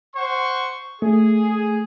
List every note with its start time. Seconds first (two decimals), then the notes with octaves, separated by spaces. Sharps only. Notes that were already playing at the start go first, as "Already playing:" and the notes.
0.16 C5 F#5 C#6
1.02 A3 G#4